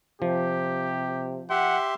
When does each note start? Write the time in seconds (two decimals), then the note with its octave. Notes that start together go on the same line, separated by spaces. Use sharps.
0.22 C3 F3 G4
1.50 G4 E5 F#5 C6